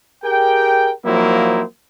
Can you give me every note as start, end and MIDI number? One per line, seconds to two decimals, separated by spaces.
0.24 0.91 67
0.24 0.91 68
0.24 0.91 70
0.24 0.91 79
1.05 1.62 53
1.05 1.62 54
1.05 1.62 58
1.05 1.62 60
1.05 1.62 63
1.05 1.62 64